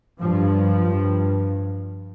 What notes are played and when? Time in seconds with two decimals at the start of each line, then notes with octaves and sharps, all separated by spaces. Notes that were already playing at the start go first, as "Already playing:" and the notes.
0.20 G2 F3
0.88 G2